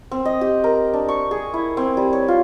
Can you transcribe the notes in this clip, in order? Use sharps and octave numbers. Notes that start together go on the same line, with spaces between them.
C4
D#5
G4
A#4
D4
C#6
G#4
E4
C4
G3
C#5
F4